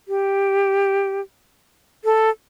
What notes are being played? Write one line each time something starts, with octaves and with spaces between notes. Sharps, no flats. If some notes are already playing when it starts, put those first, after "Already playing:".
G4
A4